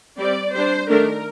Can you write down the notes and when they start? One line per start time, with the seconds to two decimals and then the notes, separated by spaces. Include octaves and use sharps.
0.18 G3 C4 D5
0.53 G3 D4 C5
0.89 D#3 A3 D4 A#4